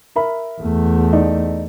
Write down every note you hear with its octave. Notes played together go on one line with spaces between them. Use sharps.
A#4 E5 B5
E2 A3
D#4 D5